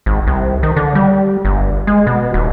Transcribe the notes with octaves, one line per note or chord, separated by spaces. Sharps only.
G#1
C2
D#3
D3
G3
G1
G#3
B2
D#1